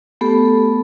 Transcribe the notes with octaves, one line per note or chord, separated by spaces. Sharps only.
A3 B3 G4 A4